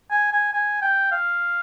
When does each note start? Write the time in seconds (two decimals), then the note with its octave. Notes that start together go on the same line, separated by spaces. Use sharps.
0.11 G#5
0.32 G#5
0.53 G#5
0.82 G5
1.12 F5